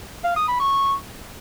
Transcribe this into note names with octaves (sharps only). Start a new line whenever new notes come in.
F5
D#6
B5
C#6